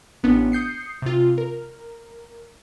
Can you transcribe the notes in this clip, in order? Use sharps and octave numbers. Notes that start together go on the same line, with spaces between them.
A1 B3 D4
D#6 G6 C7 C#7
C3 F4
A#4